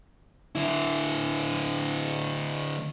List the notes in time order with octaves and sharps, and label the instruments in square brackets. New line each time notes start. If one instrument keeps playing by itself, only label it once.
[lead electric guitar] D3 E4